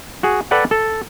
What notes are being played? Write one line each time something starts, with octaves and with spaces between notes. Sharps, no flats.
F#4 G#4
A4 B4 D5 F#5 G5
A4